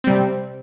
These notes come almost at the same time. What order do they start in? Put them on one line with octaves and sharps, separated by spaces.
C4 G3 C3